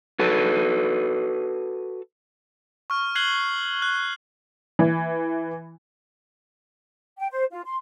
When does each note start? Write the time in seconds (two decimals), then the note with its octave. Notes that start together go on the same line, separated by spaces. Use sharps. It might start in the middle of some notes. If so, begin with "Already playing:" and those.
0.19 F#4 A4 B4
2.90 C#6 F6
3.15 F#6 G#6 C7 F#7 G7
3.82 F#6
4.79 E3
7.19 G5
7.31 C5
7.51 F4
7.65 C6